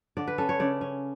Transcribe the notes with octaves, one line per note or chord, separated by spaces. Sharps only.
D3 D5
B4
C#4 A4
C#5
C#3 D5
C#4